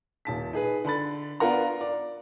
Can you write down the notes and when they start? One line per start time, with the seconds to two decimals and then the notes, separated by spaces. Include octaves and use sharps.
0.25 D#1 A5 B6
0.53 D#4 G#4 B4
0.84 D3 A5 B5 A6
1.40 B3 D4 F4 A#4 F#5 A#5
1.81 D5